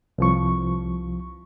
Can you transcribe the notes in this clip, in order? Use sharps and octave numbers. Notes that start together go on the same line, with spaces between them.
C2 F3 C#6